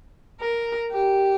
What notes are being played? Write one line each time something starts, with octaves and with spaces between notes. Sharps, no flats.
A#4
G4